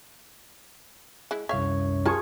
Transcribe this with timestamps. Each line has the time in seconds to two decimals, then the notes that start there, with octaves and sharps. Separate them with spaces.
1.31 G#3 E4
1.49 C2 F#2 C#5 E5 F5
2.06 F4 G#4 A#4 A5 C#6